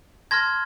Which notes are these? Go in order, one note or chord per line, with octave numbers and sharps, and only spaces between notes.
A5 C6 F6 G#6 A#6